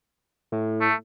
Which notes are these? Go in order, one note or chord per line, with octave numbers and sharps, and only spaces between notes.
A2
A3